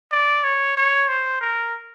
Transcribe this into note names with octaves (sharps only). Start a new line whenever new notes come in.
D5
C#5
C#5
C5
A#4